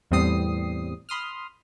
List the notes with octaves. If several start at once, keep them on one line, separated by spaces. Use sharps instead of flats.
E2 A2 G3 C4 D#6 C7
B5 C6 D#6 F6